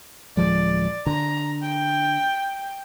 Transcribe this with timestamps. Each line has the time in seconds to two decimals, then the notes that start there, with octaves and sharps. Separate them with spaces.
0.37 D1 F3 G#3 D5
1.07 D3 A#5
1.62 G5